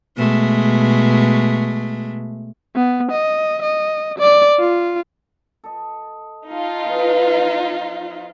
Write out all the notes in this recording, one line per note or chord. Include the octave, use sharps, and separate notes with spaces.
B2 G#3 A3
B3
D#5
D#5
D5
F4
A4 D#5
D#4 F4 A4
B2 E3 G#4
F3